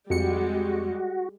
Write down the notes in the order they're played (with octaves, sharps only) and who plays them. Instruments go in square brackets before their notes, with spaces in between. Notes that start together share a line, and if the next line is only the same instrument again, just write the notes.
[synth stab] F2 C#7 [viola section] G3 G#3 [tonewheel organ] F#4